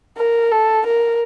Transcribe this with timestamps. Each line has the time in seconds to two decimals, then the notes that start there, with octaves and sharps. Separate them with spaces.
0.17 A#4
0.52 A4
0.86 A#4